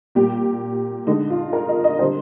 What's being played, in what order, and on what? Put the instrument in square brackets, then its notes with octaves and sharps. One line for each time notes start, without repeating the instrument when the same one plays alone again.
[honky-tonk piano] A#2 G3 G4
D3 G#3 D#4
F4
A#4
D#5
D#5
D3 G3 C5